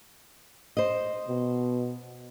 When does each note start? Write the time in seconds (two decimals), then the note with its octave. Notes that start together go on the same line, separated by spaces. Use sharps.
0.77 C5 D#5
1.28 B2